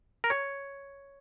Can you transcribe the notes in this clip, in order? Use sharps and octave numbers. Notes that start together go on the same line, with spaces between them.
A#4
C#5